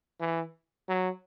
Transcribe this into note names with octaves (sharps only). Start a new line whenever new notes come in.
E3
F#3